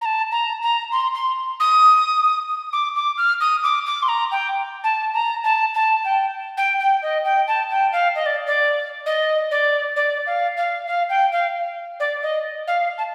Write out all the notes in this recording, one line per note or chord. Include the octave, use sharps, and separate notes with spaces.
A#5
A5
A#5
A#5
C6
C6
D#6
D6
D6
F6
D#6
D6
D6
C6
A#5
G5
A5
A#5
A5
A5
G5
G5
G5
D#5
G5
A5
G5
F5
D#5
D5
D5
D#5
D5
D5
F5
F5
F5
G5
F5
D5
D#5
F5
A5